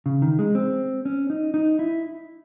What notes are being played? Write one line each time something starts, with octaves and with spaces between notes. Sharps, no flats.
C#3
D#3
G#3
C4
C#4
D#4
D#4
E4